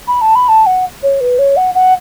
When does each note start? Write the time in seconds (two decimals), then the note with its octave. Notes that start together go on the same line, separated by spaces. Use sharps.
0.08 B5
0.21 A5
0.35 B5
0.49 A5
0.66 F#5
1.03 C#5
1.21 B4
1.39 C#5
1.57 F#5
1.75 F#5